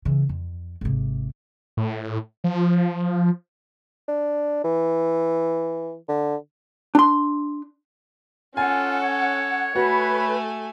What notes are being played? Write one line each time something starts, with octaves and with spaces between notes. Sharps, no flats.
C#3 E3
F2
G#1 C3
A2
F3
D4
E3
D3
D4 C6
C#4 F4 A4 F#5 G#5
C#5
A3 F#4 B4 G#5